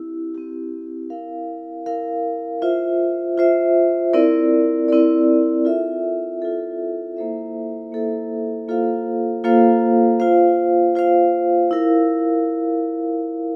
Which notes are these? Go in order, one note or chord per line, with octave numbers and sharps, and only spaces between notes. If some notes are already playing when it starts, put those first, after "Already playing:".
Already playing: C4 E4 G4
C4 E4 G4
E4 A#4 F5
E4 A#4 F5
F4 C5 E5
F4 C5 E5
C4 E4 A#4 D5
C4 E4 A#4 D5
F4 A4 E5
F4 A4 E5
A#3 E4 A4 C5 E5
A#3 E4 A4 C5 E5
A#3 F4 A4 C5 F5
A#3 F4 A4 C5 F5
F4 C5 F5
F4 C5 F5
E4 A#4 F5